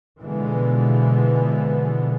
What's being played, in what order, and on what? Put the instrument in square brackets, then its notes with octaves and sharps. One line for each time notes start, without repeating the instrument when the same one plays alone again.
[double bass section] B2 D3 E3 F3 G#3 B3